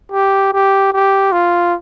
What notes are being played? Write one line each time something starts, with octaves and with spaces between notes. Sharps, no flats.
G4
G4
G4
F4